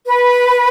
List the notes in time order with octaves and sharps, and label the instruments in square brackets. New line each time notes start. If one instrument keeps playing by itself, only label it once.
[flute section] B4